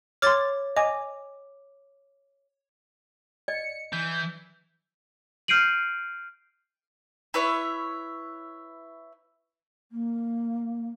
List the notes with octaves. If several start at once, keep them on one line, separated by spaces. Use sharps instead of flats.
C#5 C6 D6 F6 A6
D#5 G#5 D6
D5 D#5 C#7
E3 G6
F6 G6 C7 D7 D#7 F#7
E4 B4 C#5 E5
A#3